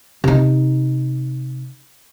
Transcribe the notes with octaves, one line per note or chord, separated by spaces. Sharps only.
C3 D#4